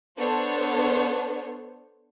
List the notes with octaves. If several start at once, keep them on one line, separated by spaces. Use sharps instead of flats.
B3 D4 A4 C5 C#5